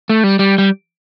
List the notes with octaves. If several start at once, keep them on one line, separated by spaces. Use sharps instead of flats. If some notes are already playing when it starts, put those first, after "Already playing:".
A3
G3
G3
G3